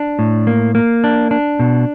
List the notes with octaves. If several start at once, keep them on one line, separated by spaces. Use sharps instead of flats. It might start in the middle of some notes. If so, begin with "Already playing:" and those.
Already playing: D4
A2
A#3
A#3
D4
D4
B2